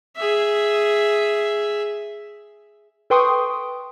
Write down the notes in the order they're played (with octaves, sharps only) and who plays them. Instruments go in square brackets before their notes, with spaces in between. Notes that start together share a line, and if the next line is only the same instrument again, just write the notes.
[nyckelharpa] G#4 E5
[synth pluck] A4 B4 G5 C6 C#6 D#6